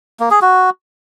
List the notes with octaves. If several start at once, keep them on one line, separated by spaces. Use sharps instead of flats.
A#3
G#4
F#4